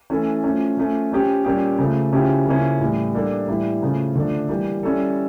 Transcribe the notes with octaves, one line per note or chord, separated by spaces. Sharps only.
E3 A3 C#4 E4 A4
F3 A3 C#4
F3 A3 C#4
F3 C#4 G4
A#2 G3 A#3 C#4 G4
C#3 F3 A3
C#3 F3 C#4 E4 G4
C#3 F3 A#3 C#4 E4
A2 E3 G3
G3 A#3 D4 A4
A2 E3 G3 A#3 E4
C#3 F3 A3 C#4
D3 F3 A3 D4
E3 G3 A#3
G3 C#4 E4 A4